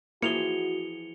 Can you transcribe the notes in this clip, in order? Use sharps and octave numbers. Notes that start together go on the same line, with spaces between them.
E3 F3 A#3 F#4 G#4 C#7 F7 G7